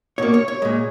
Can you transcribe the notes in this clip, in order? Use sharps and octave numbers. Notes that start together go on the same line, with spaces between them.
B2 A#3 C#5
C#5
C#5
A#2 G#3